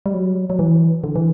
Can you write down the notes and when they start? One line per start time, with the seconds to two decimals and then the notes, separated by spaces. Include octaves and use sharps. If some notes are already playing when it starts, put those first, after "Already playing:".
0.06 G3
0.14 F#3
0.50 F#3
0.59 E3
1.04 D3
1.16 E3